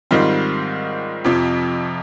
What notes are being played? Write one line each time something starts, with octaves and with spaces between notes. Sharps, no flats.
G#2 D#3 G3 C4 F4
F2 C3 F3